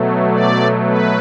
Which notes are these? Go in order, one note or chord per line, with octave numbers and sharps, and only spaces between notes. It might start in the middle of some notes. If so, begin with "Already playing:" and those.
Already playing: B2 F#3 A3
D5
B4